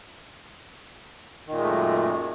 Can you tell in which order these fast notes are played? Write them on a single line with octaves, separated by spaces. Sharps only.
D#3 A#2 G#3 A3 F#2